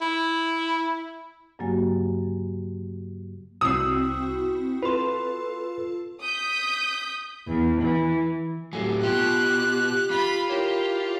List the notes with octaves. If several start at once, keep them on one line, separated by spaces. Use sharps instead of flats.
E4
G2 C#3 F#3 A#3 F#4 G#5
C2 C4 E4 F#4 D#6 E6
F4 A4 B4 C6
D#6 G6 B6
E2
E3
A2 F#3 G4 A4 G#5
B2 F4 G4 F#6 G#6
F4 B5
E4 G4 A#4 C#5